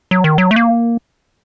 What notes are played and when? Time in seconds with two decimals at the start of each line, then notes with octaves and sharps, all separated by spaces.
0.11 F#3
0.24 D#3
0.38 F#3
0.51 A3
0.56 A#3